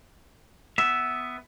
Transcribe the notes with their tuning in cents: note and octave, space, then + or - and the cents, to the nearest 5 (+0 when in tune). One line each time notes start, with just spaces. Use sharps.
B3 +10 E5 +0